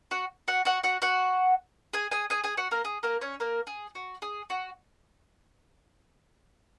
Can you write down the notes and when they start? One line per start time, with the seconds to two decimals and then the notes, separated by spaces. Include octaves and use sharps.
0.11 F#4 F#5
0.48 F#4 F#5
0.65 F#4 F#5
0.83 F#4 F#5
1.02 F#4 F#5
1.93 G#4 G#5
2.11 G#4 G#5
2.30 G#4 G#5
2.44 G#4 G#5
2.57 F#4 F#5
2.71 A#3 A#4
2.85 G#4
3.03 A#3 A#4
3.21 C#4 C#5
3.40 A#3 A#4
3.67 G#4
3.95 F#4
4.22 G#4
4.50 F#4